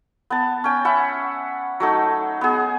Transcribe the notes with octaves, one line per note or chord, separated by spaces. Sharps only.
B3 A5
C#4 G5
E5 F#5 B5
F#3 A3 D#4
B3 G#4